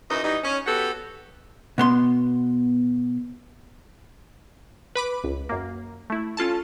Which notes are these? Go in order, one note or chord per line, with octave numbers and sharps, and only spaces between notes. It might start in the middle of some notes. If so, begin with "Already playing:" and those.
F#2 E3 D#4
E3 G3 D#4
C#4
B3 F#4 G4 A4
B2 B3 C6
B4 B5 D6
C#2
F#2 A#3
A3 E4
C#4 F4 A4 A5